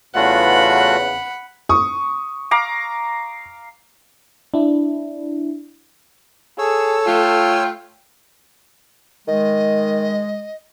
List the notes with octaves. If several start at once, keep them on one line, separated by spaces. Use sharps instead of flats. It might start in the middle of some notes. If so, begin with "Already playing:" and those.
E2 C#3 A3 F4 F#4 F#5 B5
C#6 D#6
F5 A#5 D6
D4 E4
G#4 A4 C#5 E6
A3 F4 G5
D#3 G#3 D#5